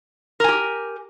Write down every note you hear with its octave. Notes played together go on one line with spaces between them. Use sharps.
G4 A#4 G#5